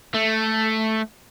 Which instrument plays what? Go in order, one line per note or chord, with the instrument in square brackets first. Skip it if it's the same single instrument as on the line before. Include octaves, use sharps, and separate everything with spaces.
[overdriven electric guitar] A3